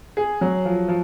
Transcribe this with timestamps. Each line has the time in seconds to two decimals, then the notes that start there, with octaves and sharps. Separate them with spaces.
0.17 G#4
0.41 F#3
0.65 F3
0.88 F3